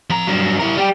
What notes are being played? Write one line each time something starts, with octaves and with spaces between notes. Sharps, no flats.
F3 A#5
G2 F#3
E4 A#4
G3 G4